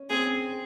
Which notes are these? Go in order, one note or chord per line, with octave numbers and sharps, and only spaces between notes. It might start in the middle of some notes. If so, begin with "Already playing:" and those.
Already playing: C#4
C4 G#4